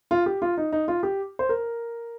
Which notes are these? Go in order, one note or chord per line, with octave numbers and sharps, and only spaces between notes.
F4
G4
F4
D#4
D#4
F4
G4
C5
A#4